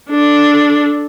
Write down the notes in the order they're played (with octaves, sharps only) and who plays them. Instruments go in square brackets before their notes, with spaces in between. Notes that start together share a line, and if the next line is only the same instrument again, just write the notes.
[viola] D4 A4